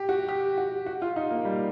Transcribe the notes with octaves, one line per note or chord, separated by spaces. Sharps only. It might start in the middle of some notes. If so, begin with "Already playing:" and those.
Already playing: G4
F#4
G4
F#4
F#4
F4
D#4
A#3
G3